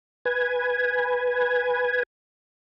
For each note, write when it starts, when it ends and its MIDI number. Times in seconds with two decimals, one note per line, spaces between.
0.25 2.03 71
0.25 2.03 80